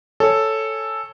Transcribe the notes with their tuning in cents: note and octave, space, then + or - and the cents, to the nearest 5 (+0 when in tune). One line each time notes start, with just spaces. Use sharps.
A4 +0 C#5 +0 G#5 +0